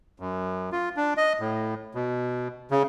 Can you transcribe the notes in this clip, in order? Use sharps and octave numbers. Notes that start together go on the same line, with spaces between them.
F#2
F4
D4
D#5
A2
B2
C#3